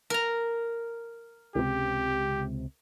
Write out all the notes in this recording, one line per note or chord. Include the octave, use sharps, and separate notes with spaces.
A#4 A#5
C#2 C3 G4